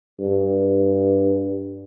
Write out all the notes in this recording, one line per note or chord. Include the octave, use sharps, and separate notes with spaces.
G2